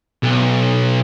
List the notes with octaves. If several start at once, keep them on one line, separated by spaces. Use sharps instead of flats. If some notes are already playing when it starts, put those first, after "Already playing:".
B1